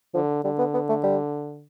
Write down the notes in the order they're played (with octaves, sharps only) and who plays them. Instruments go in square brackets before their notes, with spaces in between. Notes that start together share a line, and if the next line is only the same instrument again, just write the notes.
[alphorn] D3 [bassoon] F3
[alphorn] D3 [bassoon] G3
[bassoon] B3
B3
A3
G3